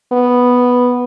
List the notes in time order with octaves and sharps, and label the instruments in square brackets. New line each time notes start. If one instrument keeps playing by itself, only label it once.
[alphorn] B3